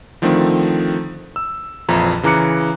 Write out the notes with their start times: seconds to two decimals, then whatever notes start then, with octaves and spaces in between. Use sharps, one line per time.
0.22 D3 D#3 F3 A3 C4
1.36 E6
1.89 A#1 F2 E3 F3 E4 A#5
2.23 C#3 E3 A#5 D6 F#6 C#7